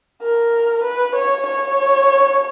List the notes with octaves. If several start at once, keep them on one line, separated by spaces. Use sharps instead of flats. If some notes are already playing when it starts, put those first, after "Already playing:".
A#4
B4
C#5
C#5